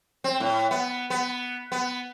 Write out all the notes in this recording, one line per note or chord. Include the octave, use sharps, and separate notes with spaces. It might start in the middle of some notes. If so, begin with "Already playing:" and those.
C4
A2
B3
B3
B3